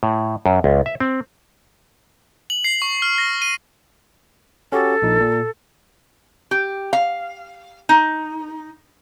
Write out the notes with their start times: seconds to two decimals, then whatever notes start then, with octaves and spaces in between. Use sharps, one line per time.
0.03 A2
0.46 F#2
0.64 C#2
0.86 E5
1.00 C4
2.50 F#7
2.64 C7
2.82 C#6
3.02 F6
3.18 A#6
3.42 D#7
4.72 C#4 F#4 G4 A4
5.02 A#1 A#2 D#4
5.20 A#2
6.51 G4
6.93 F5
7.89 D#4